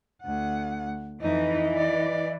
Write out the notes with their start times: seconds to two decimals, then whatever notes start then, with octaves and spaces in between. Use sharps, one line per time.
0.23 D2 F#5
1.21 F2 E3 D#4 D#5
1.76 D5